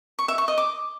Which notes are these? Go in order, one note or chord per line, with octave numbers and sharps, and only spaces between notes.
C#6
E5
C#6
D#5
D6